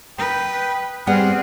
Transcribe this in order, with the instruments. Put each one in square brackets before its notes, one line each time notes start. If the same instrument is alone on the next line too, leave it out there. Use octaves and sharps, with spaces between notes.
[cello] B4 [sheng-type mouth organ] G5 D#6
[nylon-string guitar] G3 B3 F#5 [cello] C4 G#4 [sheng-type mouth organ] D#6 F6 F#6